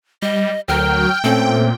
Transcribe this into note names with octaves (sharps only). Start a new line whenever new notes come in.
G3 D#5
D2 F#3 A#4 G5 F6
A#2 A3 C4 C#4 A4